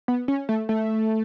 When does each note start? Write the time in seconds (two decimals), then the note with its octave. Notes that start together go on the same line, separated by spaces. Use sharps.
0.08 B3
0.28 C#4
0.49 A3
0.69 A3